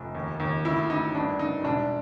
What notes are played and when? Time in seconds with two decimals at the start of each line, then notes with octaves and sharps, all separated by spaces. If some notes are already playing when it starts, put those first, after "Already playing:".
Already playing: F1
0.15 D#2
0.40 D#2
0.65 D2 E4
0.90 D2 D#4
1.15 G1 D4
1.39 G1 D#4
1.64 E1 D4